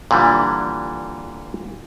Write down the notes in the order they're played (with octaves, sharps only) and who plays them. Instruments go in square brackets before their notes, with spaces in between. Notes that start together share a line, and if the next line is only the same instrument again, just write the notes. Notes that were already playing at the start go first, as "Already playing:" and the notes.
[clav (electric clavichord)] A#2 D3 E3 G3